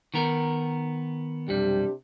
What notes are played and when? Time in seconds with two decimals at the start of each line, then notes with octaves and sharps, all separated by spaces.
0.14 D#3 B3 A#4
1.48 B1 F2 C3 G3 D4 G4